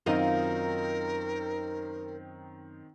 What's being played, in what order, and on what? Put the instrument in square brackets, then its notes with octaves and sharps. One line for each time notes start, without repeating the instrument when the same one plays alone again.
[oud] F#2 F4 D#5 [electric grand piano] D#3 C4 D#4 [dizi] A#4